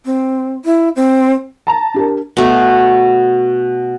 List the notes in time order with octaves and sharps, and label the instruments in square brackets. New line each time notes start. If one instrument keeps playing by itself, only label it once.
[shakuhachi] C4
E4
C4
[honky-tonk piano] A5 A#5
[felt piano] D4 G4 A#4
[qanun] B2 A3